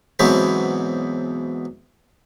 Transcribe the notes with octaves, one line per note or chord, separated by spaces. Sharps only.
G#2 B2 E3 F#3 B3 C4